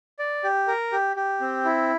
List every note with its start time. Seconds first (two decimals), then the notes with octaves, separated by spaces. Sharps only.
0.19 D5
0.44 G4
0.68 A#4
0.92 G4
1.16 G4
1.41 C4
1.65 E4